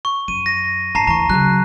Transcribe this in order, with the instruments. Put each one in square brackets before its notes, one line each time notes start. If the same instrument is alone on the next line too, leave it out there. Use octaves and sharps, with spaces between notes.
[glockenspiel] C#6
[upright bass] F#2 [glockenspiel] D#7
[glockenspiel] A#6
[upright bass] G2 [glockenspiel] A5 A#5 C7
[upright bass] D2 E3 [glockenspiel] A#5 C#6
[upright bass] C#3 F#3 [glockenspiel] F#6